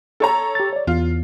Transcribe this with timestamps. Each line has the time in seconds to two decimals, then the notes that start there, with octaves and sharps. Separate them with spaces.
0.20 A4 C#5 A#5
0.55 G4 A6
0.73 C#5 D5
0.87 E2 F4